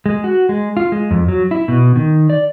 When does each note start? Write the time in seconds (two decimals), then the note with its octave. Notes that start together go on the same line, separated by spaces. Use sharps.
0.06 G#3
0.24 F#4
0.49 G#3
0.77 F4
0.92 G#3
1.11 F2
1.28 F#3
1.51 E4
1.68 B2
1.96 D#3
2.30 D5